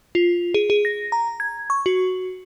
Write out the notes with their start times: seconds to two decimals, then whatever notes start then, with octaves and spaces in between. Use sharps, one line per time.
0.15 F4
0.54 G#4
0.70 G#4
0.85 A#6
1.12 A#5
1.40 G#6
1.70 C#6
1.86 F#4